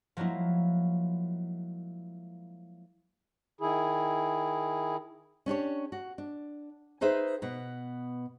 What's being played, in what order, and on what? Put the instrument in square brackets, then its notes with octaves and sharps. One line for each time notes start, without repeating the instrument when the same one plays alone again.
[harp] F3 F#3 G#3 A#3 E4
[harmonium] D#3 E4 G#4
[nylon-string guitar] C#4 D4 G4 C#5
F#4
D4
D#4 G#4 B4 C5 E5
B2 B3